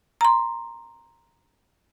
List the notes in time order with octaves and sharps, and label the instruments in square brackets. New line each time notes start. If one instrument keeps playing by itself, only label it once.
[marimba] A#5 C6